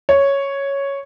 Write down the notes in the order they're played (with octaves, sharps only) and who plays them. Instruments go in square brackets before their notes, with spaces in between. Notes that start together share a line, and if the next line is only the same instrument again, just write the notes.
[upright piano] C#5